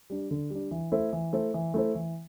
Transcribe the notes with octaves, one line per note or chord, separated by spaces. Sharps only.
G3 D4
D3
G3 D4
E3
A3 E4 A4 C5
E3
A3 E4 A4 C5
E3
A3 E4 A4 C5
E3